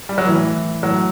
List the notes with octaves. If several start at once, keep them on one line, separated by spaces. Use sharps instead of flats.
G3
F#3
A2 E3
A2 E3 F#3